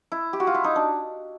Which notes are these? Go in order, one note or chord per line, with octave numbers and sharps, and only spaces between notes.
E4
G4
F#4
F4
E4
D#4
D4